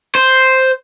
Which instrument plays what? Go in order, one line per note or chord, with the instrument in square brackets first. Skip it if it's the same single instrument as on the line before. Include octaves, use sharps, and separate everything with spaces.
[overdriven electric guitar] C5